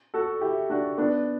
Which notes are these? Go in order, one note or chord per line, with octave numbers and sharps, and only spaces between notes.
F#4 A4
E4 G4
D4 F#4
B3 D4